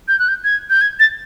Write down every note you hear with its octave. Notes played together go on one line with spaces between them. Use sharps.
G6
F#6
G6
G#6
G6
G#6
A6